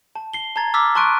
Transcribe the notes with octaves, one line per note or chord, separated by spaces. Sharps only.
A5
C7 G7
A5 A#5 G#6 A6
A#5 D6 E6 F6 A6 B6
A5 C6 C#6 F#6 D7 D#7